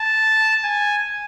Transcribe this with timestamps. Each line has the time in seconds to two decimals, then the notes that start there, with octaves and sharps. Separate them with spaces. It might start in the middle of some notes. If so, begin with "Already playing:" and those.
Already playing: A5
0.64 G#5